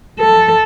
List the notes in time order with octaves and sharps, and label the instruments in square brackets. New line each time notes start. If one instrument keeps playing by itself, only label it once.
[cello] A4